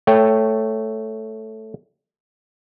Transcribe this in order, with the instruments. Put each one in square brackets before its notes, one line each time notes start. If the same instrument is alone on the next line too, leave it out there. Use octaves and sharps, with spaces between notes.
[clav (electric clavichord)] A3 C#5 G5